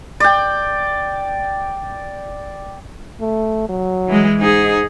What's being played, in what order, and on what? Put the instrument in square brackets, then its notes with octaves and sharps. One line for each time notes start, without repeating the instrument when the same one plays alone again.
[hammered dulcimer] D5 G5
[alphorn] A3
F#3
[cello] E3 G#3
[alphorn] G#2 [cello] D#4 G#4